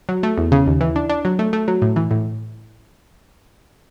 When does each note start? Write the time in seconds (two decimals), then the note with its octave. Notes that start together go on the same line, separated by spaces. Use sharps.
0.09 F#3
0.23 A3
0.38 E2
0.52 C#3
0.66 D#2
0.81 E3
0.96 D4
1.09 D4
1.25 F#3
1.39 A3
1.53 A3
1.68 F#3
1.82 A2
1.96 E3
2.11 A2